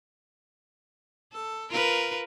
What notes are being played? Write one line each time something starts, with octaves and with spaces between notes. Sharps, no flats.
A4
F4 A#4 B4